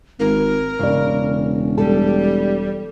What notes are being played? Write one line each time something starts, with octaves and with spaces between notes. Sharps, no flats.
G#1 A#4
E1 C#3 D5
G3 A4